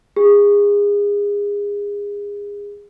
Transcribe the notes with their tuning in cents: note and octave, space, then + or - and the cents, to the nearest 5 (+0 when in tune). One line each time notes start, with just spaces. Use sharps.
G#4 -30